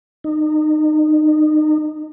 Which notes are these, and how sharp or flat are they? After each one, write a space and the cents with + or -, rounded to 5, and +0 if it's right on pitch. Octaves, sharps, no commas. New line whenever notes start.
D#4 -25